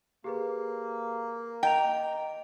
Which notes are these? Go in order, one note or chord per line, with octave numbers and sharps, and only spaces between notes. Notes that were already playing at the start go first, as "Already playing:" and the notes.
A#3 G4 G#4 B4
D#5 G5 A#5 F7